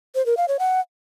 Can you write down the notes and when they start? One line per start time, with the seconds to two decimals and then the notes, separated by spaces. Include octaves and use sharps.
0.15 C5
0.26 A#4
0.37 F5
0.48 C#5
0.59 F#5